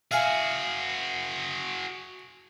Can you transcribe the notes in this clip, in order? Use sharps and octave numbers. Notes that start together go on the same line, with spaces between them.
F#4 G#4 E5 F5 G#5